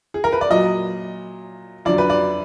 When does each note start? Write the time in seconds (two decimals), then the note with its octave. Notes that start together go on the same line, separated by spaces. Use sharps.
0.14 G#4
0.24 A#4
0.32 B4
0.41 D5
0.49 A#2 F#3 D#5
1.85 F2 D3 F#3 D5
1.98 B4
2.10 D5